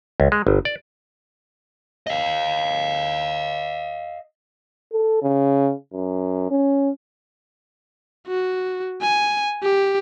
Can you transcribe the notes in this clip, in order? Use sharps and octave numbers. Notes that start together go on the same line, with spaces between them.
C#2
G#3
G1
D5
D#5 F5
A4
C#3
F#2
C#4
F#4
G#5
G4